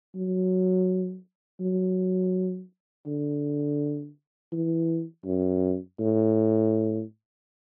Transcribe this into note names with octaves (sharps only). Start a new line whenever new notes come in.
F#3
F#3
D3
E3
F#2
A2